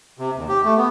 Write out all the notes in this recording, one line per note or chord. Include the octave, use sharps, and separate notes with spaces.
C3
D#2
G4
A3
B3